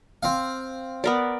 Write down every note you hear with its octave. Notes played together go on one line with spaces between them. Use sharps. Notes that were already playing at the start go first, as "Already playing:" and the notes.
C4 F5
B3 A#4 D5